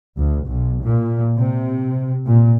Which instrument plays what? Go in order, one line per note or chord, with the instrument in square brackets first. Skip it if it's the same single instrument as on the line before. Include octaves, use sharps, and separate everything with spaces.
[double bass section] D2
B1
A#2
C3
A#2